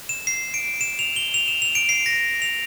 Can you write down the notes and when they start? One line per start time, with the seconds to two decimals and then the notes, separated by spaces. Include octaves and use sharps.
0.09 E7
0.27 C7
0.54 D7
0.81 E7
0.99 F7
1.16 G7
1.34 F7
1.48 E7
1.62 F7
1.75 D7
1.89 C7
2.06 A#6
2.42 F7